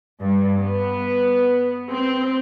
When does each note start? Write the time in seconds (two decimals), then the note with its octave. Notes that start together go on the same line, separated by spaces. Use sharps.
0.20 G2
0.59 B3
1.92 C4